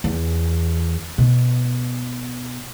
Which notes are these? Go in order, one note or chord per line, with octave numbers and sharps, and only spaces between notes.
E2
B2